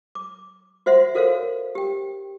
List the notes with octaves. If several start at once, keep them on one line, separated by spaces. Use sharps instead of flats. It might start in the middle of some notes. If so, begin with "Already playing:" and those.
D6
F#4 C5 E5 F#5 C6
F#4 A4 A#4 C5 C#5 F5
G4 G5